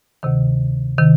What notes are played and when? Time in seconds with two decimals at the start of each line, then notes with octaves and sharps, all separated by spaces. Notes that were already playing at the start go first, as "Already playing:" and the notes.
0.23 D2 C3 D#3
0.98 C3 D#3